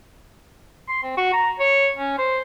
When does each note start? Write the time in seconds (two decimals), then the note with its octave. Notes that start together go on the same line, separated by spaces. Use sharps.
0.89 C6
1.03 C4
1.17 F#4
1.33 A#5
1.60 C#5
1.96 C#4
2.18 C5